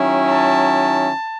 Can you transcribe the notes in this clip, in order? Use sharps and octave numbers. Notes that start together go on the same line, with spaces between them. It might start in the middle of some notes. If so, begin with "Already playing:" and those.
Already playing: D#3 F#3 C#4 E4
A5